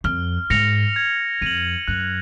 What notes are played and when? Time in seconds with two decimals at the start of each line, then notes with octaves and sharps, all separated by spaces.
0.04 F2 F6
0.50 G#2 A#6 C#7 F7
0.96 G#6
1.41 F2 D#7 F#7
1.87 F#2 F#6